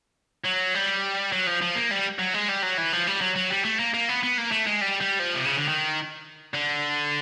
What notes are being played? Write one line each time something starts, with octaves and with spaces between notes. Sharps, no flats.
F#3
G3
F#3
F3
F3
A#3
G3
F#3
G#3
G3
F#3
E3
F3
G3
F#3
F#3
G3
A3
A#3
A#3
B3
B3
A#3
A3
G#3
G3
G3
F3
C3
C#3
D3
D#3
D3